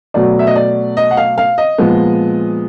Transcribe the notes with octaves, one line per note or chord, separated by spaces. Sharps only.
B2 F#3 A3 D5
E5
D#5
D5
D#5
F#5
F5
F5
D#5
A#2 F3 G#3 B3